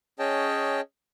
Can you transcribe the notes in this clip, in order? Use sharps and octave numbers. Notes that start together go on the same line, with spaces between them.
C#4 G#4 C#5 D#5 G5 A5